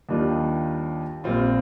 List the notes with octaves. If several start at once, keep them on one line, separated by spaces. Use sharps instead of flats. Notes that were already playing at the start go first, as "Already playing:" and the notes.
D#2 D#3 G3 D4 F4
A#1 A#2 G3 C4 F4